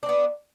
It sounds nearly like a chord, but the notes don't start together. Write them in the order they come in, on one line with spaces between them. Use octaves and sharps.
D4 C4 B3